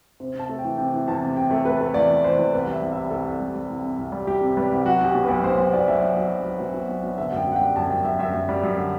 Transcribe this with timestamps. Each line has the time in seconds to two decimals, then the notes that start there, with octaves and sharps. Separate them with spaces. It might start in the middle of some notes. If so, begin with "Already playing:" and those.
0.20 C3 C5
0.35 C3 A5
0.49 A3
0.59 G5
0.65 E3
0.78 C3 G5
0.93 E3
1.08 E2 A5
1.22 C3
1.36 C3 G5
1.51 A3
1.65 A3 B4
1.81 A3
1.94 E2 D5
2.09 E3
2.24 E3 C5
2.39 E2
2.53 C2 B4
2.67 G3
2.72 E5
2.81 C2
2.92 G3 E5
3.11 C2 A4
3.26 C2
3.41 G3
3.55 G3
3.69 C2
3.83 C3
3.98 C2
4.12 G3
4.27 G3 G4
4.41 C3
4.57 G3 B4
4.72 C2
4.85 F#3 F#4
5.01 B1 G4
5.15 B2
5.25 B1 B4
5.43 B2 C5
5.58 B1 C5
5.73 B1 D5
5.88 B1 E5
6.02 B1
6.16 B1
6.30 B1
6.45 F#3
6.60 B2
6.74 B2
6.89 B1
7.03 B2
7.18 D3 E5
7.32 F#2 G5
7.47 F#2 F#5
7.56 G5
7.61 G3
7.76 F#2 A5
7.90 F#2 G5
8.05 F#2 E5
8.19 F#2 E5
8.34 F#2
8.49 G3
8.64 F#2
8.78 D3